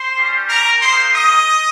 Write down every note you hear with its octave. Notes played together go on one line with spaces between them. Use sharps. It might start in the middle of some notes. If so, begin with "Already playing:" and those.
Already playing: C5 C6
G3 C#4 G4
A#4 A#5
A#3 D#4 G4 C5 C6
D#5 D#6